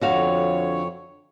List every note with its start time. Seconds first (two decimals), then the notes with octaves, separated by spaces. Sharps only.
0.01 F2 D3 F#4 C#5 F5